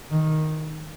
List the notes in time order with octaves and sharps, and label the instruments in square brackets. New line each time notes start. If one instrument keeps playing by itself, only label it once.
[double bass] D#3